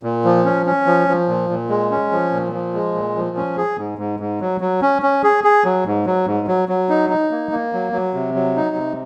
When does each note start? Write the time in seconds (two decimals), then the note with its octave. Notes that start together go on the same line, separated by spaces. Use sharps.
0.03 A#2
0.24 F3
0.45 C#4
0.66 C#4
0.86 F3
1.08 F3
1.28 A#2
1.50 A#2
1.69 G#3
1.91 C#4
2.12 F3
2.32 A#2
2.53 F3
2.74 G#3
2.94 A#2
3.16 F3
3.37 C#4
3.57 G#4
3.78 G#2
3.98 G#2
4.20 G#2
4.41 F#3
4.61 F#3
4.82 C#4
5.02 C#4
5.23 G#4
5.44 G#4
5.64 F#3
5.86 G#2
6.06 F#3
6.26 G#2
6.48 F#3
6.69 F#3
6.89 D#4
7.10 D#4
7.31 A#3
7.52 A#3
7.73 F#3
7.93 F#3
8.14 C3
8.34 F#3
8.56 D#4
8.76 C3